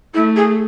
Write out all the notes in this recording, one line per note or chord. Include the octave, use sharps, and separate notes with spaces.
A3 E4
G#4